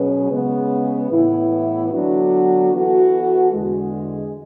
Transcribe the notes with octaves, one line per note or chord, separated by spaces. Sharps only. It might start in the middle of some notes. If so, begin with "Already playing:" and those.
Already playing: B2 F#3 C#4 G#4 B4
C#3 G#3 B3
A2 E3 B3 E4
D3 F#3 B3 D4 F#4
E3 B3 F#4 A4
E2 D3 G#3